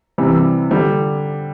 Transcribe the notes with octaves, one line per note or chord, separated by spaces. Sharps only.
C3 E3 G3
D3 G3